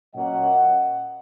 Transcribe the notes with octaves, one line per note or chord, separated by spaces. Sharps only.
A#2 F#3 A#3 C#4 D#5 F#5